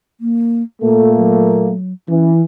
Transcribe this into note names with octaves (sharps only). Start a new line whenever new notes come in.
A#3
A#2 A3 A#3 A4
F#3
E3 C#4